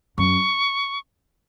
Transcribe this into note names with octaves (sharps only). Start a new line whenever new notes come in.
F#2 C#6